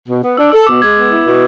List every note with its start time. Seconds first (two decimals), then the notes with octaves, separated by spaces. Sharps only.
0.09 B2
0.23 B3
0.37 D4 E6
0.52 A4 E6
0.67 B2 D6
0.82 G#3 G#6
0.97 B3
1.11 E4
1.26 B2